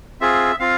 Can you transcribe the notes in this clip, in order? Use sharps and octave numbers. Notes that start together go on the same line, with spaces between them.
C4 F4 G#4 E5
C4 F4 F5